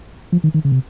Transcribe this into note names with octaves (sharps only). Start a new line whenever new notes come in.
F3
D#3
D#3
C#3
C3